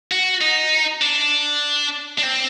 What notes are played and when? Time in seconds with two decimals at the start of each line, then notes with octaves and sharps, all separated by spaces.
0.12 F#4
0.41 D#4
1.01 D4
2.18 D4
2.23 C4